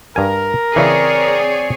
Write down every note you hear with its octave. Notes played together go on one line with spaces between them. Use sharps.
G2 A#4 G#5
C#3 E3 C4 G#4 C#5 D5